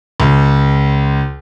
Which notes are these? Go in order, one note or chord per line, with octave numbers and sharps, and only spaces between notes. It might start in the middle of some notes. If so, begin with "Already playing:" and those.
C#2